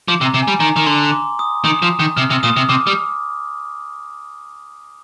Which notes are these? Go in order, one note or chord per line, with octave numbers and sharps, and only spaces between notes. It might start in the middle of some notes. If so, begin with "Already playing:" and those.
F3 D6
C3
A#5
C3
G#5
G3
D#3 A#5
D#3
D3 C6
D6
D#6
D#3 D#6
F3
D#3
C3 F6
C3
A#2 D#6
C3
C3 D6
G3